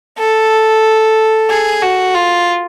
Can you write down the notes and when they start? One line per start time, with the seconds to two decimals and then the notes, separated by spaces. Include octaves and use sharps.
0.19 A4
1.50 G#4
1.82 F#4
2.15 F4